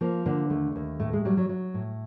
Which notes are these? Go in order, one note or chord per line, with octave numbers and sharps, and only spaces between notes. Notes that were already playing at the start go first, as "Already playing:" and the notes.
F3 A#3
D3 A#3
D#2 A3
D#2
A2 A3
G#3
F#3 G3
F#3
F#3
A2